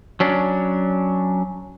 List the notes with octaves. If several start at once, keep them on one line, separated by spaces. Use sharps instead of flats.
F#3 C#4 D4